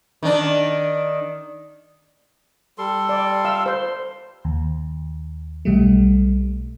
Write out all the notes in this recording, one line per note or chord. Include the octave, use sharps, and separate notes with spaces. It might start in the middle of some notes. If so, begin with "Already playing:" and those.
D#3 D4
G3 A4 C6
D5
F5 E6
C5 C6
D#2
B1 B2 G3 A3